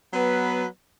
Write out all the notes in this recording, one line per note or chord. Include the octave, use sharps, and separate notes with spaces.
F#3 B3 B4